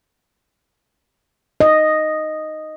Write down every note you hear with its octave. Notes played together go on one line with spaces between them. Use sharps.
D#5